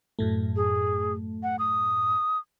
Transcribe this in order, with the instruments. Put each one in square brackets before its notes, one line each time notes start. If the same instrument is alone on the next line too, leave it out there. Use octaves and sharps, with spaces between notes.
[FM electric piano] F#2 A2 A3
[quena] G#4
F#5
D#6